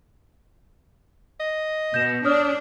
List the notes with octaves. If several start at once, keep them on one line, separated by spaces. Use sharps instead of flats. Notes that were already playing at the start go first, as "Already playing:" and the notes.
D#5
B2 G6 A#6 E7
D4 C#5 D#6 F6